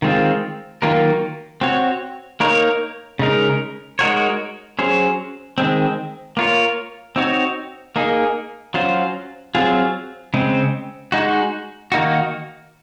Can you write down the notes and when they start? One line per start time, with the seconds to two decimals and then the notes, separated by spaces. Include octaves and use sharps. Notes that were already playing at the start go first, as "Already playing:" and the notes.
0.02 D#3 G#3 C4 F4
0.82 D#3 F#3 A#3 F4 A#4
1.61 C4 F#4 C#5
2.40 A#3 D#4 A#4 C#5
3.19 C#3 G#3 D#4 A#4
3.99 G#3 D#4 F#4 A#4 C#5
4.79 F#3 C#4 G#4 C5
5.58 D#3 G#3 C4
6.37 A#3 F4 A#4 C#5
7.16 C4 D#4 F#4 C#5
7.96 A#3 D#4 G#4
8.74 F#3 C#4 F4 C5
9.55 F#3 C4 F4 G#4
10.34 C#3 G#3 C4
11.12 G#3 D#4 F#4
11.92 D#3 A#3 D#4 F#4